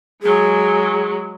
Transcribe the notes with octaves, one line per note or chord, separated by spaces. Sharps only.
F#3 G#3 G#4